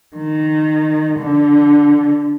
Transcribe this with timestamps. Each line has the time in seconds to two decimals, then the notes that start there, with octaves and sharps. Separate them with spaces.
0.17 D#3
1.19 D3